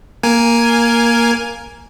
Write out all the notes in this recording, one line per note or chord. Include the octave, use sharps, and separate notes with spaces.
A#3 A#4 G#5